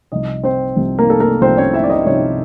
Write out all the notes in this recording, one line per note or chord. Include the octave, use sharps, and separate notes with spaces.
C2 C3 F3 D#4 D#5
C4 C5
C2 C3 F3
A#3 A#4
A4
A#3 A#4
C2 C3 F3 C4 C5
C#4 C#5
E4 E5
D5
D#4 D#5
C2 C3 F3 C#4 C#5